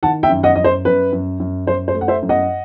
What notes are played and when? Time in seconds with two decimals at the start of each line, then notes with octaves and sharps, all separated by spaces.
0.03 D#3 F#5 A5
0.23 E5 G5
0.30 F#2
0.43 D#5 F#5
0.56 F#2 D#5
0.64 C5
0.85 F#2 B4
1.12 F#2
1.40 F#2
1.66 F#2 C5
1.88 C5
1.94 A3
2.01 F#5
2.08 C5 E5
2.22 F#2
2.29 D#5 F#5